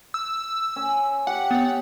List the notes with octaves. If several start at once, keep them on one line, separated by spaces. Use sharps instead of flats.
E6
C#4
G4 F#5
B3 C#5